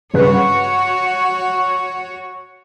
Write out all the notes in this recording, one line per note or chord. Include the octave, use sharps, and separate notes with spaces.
G2 C#3 F#4 B4 C#5